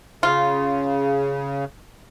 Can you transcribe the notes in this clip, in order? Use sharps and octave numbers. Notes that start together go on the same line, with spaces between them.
C#3 F4